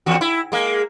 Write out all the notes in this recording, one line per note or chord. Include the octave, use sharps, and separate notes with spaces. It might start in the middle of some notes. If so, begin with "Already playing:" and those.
E2 F#4
E4
G#3 A#3